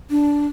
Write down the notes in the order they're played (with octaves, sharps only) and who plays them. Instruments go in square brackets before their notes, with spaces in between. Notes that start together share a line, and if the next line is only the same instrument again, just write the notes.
[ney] D4